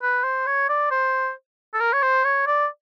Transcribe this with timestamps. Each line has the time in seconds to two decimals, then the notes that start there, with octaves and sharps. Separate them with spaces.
0.02 B4
0.24 C5
0.46 C#5
0.69 D5
0.91 C5
1.74 A4
1.80 A#4
1.93 C#5
2.02 C5
2.24 C#5
2.46 D5